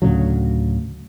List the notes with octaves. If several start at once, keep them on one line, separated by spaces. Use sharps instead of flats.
D2 A2 C#3 F#3